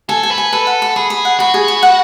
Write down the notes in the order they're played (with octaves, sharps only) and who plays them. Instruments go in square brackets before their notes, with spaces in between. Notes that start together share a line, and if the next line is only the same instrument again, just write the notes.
[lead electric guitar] A4 [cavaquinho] G#5
[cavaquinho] G#5
[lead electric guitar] B4
[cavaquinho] G#5
[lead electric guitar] A4 [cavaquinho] B4
[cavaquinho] F#5
B5
[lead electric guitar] G#4 [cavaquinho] B5
[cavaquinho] B5
F#5
[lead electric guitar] F#4 [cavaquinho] B5
[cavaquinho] G#4
B5
F#5